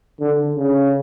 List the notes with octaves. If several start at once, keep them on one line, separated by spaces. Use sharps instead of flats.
D3
C#3